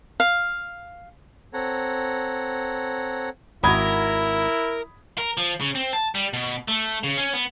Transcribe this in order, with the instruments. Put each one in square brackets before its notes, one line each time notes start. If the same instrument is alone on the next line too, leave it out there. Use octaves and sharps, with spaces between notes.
[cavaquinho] F5
[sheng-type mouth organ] C4 A4 C#5 F#5 A#5
[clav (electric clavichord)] G#1 F#4 [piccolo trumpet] E4 [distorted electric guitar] A#4 [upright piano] B5 D#6 G#6
[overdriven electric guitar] A#4
F3
C#3
C4
A5
G3
B2
A3
C#3
C#4
B3